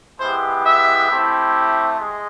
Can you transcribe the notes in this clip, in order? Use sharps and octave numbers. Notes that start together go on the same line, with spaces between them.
G#3 B3 E4 G4 C5
E5
A3 C4 E4 G4
G#3